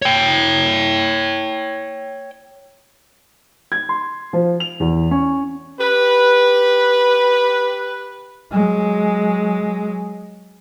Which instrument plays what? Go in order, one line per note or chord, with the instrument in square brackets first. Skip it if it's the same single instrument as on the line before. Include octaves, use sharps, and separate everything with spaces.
[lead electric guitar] C#5 G5
[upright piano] G#6
C6
F3
F7
E2
C#4
[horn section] G4 B4
[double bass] F#3 G#3